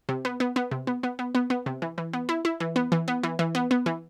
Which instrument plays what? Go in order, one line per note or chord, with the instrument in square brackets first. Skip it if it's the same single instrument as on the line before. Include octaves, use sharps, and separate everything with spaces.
[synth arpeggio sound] C3
B3
B3
B3
C3
B3
B3
B3
B3
B3
C3
E3
E3
B3
E4
E4
E3
B3
E3
B3
E3
E3
B3
B3
E3